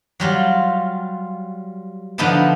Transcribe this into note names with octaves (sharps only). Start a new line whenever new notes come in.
F#3 G3 F4
D3 F3 B3 D#4 E4 A5